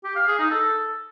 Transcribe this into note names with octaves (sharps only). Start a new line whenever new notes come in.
G4
F5
G#4
D#4
A4